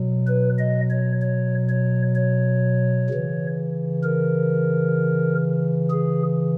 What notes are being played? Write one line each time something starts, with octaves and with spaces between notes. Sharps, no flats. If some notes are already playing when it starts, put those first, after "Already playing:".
Already playing: B2 F#3
B4
D#5
C#5
C#5
C#5
C#5
C#3 E3
A#4
G#4